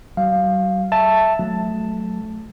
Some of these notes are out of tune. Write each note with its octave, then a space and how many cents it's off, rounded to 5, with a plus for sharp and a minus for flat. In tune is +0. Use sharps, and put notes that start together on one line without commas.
F#3 +45 F5 +0
E5 +0 A5 +5
F#3 +0 A3 -10